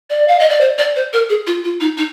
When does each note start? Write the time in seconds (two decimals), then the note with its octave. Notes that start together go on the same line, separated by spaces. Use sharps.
0.10 D5
0.28 F5
0.39 D#5
0.49 D5
0.61 C5
0.78 D5
0.96 C5
1.13 A#4
1.29 G#4
1.47 F4
1.64 F4
1.80 D#4
1.97 D#4